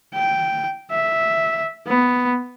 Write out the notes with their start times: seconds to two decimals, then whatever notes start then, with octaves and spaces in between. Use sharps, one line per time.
0.14 G5
0.91 E5
1.88 B3